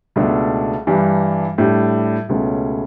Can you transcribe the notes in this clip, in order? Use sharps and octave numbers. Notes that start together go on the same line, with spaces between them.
C#2 B2 A3 D4 A4
G2 E3 G3 D4
A2 G3 D4
C#2 B2 A3 C#4